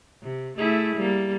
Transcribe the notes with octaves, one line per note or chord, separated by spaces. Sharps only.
C3
A3 E4 G#4
G3 A#3